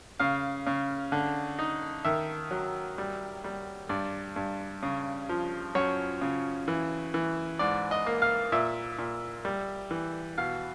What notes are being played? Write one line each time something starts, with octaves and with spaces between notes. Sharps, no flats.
C#3 F5
C#3
D3
D#4
D#3 E5
F#3
G3
G3
G2 D5
G2
C#3
F3
F#2 C#5
C#3
E3
E3
G#2 D5
D#5
A#3
F5
A#2 E5
A#2
G3
E3
B2 F5